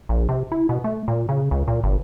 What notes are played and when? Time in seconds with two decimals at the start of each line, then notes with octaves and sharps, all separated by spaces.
0.09 A#1
0.29 C3
0.52 E4
0.69 B2
0.84 A3
1.08 A#2
1.29 C#3
1.51 C#2
1.68 A#2
1.84 G1